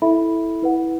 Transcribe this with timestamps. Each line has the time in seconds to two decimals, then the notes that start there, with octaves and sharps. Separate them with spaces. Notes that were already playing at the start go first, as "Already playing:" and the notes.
0.02 E4 A4 E5 B5
0.62 E4 B4 F#5